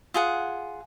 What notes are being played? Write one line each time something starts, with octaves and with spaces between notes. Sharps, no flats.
F4 G#4 F#5